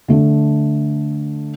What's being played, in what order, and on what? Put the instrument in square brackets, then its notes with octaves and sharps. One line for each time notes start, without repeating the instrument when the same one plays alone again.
[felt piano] D3 A3